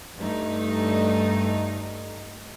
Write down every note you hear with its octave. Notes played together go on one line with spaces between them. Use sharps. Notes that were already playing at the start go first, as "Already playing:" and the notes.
G2 A3 D#4